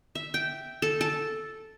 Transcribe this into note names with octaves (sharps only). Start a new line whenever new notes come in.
E5
G5
A4
A4